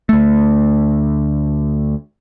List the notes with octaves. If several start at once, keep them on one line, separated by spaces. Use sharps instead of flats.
D2 A3